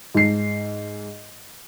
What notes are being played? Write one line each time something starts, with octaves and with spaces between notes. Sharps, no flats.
G#2 C7